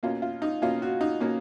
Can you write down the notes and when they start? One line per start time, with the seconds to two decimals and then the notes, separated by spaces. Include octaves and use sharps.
0.03 B2 A#3 C#4 F4
0.22 F4
0.42 D#4
0.62 B2 A#3 C#4 F4
0.82 F#4
1.01 D#4
1.20 B2 A#3 C#4